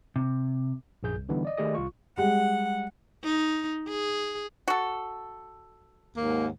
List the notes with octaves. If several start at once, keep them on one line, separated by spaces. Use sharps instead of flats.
C3
A#1 F#2 G#4 G6
C2
D3 E3 G3 B3 D4 D#4
D5 D#5
D#3 A3 G4 G#4 D5 D#5
C2 F4 C#6
G3 G#3 F#5
D#4
G#4
F#4 A4
D#2 G#2 A#3